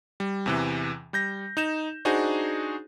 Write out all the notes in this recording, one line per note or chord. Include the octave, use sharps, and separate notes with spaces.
G3
E2 C3 E3
G3 G6 A#6
D#4 G6 E7
D4 D#4 F#4 G#4 C5